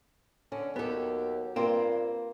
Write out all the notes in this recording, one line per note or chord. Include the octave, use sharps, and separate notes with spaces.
D3 C#4
D#2 F#3 B3 G4 A4
G2 A#3 C4 F4